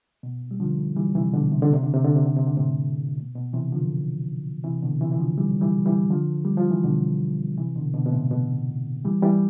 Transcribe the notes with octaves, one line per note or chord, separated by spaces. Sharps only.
B2
G3
D3 F3
E3 G3
C3 E3
B2 D3
C3
D3
C3
D3
C3
D3
C3
D3
C3
D3
A2 C3
B2
B2
C3 E3
D3 F3
C3 E3
B2 D3
C3 E3
E3
D3 F3
E3 G3
E3 G3
E3 G3
D3 F3
G3
F3
E3
B2 D3
C3 E3
B2 D3
B2 D3
B2
A2 C3
B2
E3 G3
E3 G3